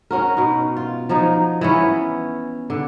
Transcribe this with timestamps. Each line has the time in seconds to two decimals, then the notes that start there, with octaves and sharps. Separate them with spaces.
0.11 C#4 F#4 A#4
0.37 B2 D#4
0.77 F4
1.09 F3 F#3 D#4
1.61 E3 B3 C#4
2.70 D3